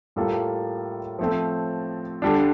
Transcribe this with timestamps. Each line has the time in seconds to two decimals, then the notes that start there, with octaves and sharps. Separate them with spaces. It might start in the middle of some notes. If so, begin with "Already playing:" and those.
0.16 A2 G3 A#3 F4 A4
1.19 F3 A3 C4
2.22 D3 G3 D4